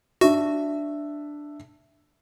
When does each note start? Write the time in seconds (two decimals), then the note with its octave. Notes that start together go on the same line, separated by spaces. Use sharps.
0.21 D4 F#4 E5